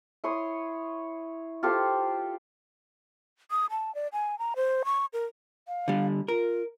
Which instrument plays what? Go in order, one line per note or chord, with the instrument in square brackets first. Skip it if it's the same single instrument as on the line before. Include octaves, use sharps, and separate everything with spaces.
[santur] E4 C#5 C6 D#6
F4 G4 A4 C5
[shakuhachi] D#6
A5
D5
G#5
A#5
C5
C#6
A#4
[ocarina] F5
[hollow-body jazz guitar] D3 G3
[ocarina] F4 [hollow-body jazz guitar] A#4